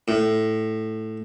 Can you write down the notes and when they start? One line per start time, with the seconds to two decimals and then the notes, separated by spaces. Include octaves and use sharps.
0.08 A2